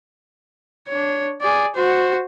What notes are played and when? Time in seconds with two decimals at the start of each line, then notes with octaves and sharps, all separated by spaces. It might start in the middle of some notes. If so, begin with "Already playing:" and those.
0.88 D4 C#5
1.41 G#4 D5
1.75 F#4 C5